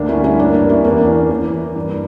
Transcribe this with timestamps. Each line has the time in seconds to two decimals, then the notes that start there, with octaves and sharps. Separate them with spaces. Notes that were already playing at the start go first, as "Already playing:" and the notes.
Already playing: D2 A#3 D4
0.09 C#4 E4
0.17 G3
0.24 C#4 E4
0.39 G2 A#3 D4
0.55 A#3 D4
0.62 E3
0.69 C#4 E4
0.84 E2 A#3 D4
1.00 C#4
1.08 E3
1.14 A#3
1.30 E3 A#3
1.53 E3
1.76 G2